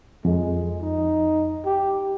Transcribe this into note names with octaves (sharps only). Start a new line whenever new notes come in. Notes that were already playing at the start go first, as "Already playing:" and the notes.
F2 G#3
D#4
G4